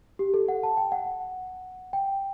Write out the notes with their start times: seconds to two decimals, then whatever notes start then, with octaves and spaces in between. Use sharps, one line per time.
0.19 G4
0.34 A4
0.48 F#5
0.63 A5
0.77 G5
0.92 F#5
1.93 G5